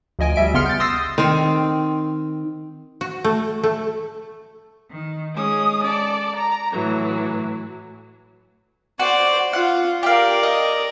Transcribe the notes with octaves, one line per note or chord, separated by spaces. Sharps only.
D2 F3 D#5 G#5 D7
D2 G3 E5 D7
G1 C#3 B3 C6 F6 C#7
G6 A6
C6 D#6 E6 A6 A#6 C7
D#3 C4
F#4
A3
A3
D#3
G#3 C#4 D#6
A4 D5
A#5
A2 E3 F#3
F#4 C5 D5
F4 F#5
G4 A#4 D5 F5
D#5